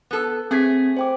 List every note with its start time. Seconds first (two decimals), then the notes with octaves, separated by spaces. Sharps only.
0.11 B3 A4
0.51 A3 C4 G#4 G#6 B6
0.97 C5 G5 D6